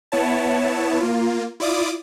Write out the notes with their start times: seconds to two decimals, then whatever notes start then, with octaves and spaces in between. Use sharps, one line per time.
0.12 B3 E4 C#5 A5
1.00 A#3 F4
1.60 E4 F4 D5 D6 D#6